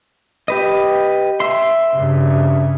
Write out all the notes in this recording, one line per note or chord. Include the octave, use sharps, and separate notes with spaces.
G4 B4 D#5
E5 C6
G2 C#3